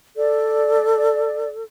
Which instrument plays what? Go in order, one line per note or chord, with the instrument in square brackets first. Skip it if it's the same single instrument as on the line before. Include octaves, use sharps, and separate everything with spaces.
[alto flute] A4 [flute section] D5